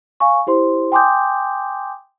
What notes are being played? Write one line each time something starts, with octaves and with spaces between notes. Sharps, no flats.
F5 G#5 C#6
E4 G4 C5 C6
G5 G#5 C6 D6 D#6 G6